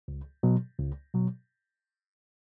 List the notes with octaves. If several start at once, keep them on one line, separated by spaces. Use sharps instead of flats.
C#2
B2 F#3
C#2
B2 F#3